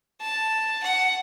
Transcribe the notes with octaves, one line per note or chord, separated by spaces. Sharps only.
A5
F#5